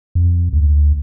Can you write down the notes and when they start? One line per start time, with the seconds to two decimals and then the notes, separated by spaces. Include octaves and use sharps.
0.15 F2
0.53 D2